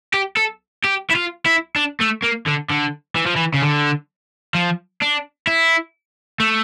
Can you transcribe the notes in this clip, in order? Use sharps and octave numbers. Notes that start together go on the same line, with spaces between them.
G4
A4
G4
E4
F4
E4
D4
A3
A#3
D3
D3
E3
F3
E3
C#3
D3
F3
D4
E4
A3